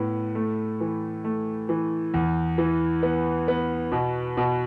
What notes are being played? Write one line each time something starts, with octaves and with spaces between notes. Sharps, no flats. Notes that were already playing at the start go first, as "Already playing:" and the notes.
Already playing: A2 B3
A3
E3
A3
E3
E2
E3
B3
B3
B2
B2